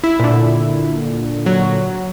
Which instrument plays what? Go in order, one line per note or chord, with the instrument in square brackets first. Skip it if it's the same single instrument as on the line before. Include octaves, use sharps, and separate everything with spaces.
[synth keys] E4
[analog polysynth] A#2 D3
[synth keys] F#3